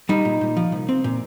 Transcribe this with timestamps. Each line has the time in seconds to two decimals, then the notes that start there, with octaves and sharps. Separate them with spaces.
0.09 G3 D#4
0.25 A#2
0.41 A#2
0.57 F3
0.72 C2
0.89 C4
1.04 A#2